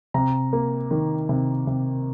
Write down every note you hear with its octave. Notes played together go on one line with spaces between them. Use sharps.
C3 A#5
A#3
D#3
C3
C3